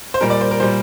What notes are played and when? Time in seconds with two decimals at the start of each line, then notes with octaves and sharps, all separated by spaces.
0.14 C5
0.21 A#2 G3 A#4
0.30 D5
0.41 C5
0.51 A#4
0.60 A#2 G3 C5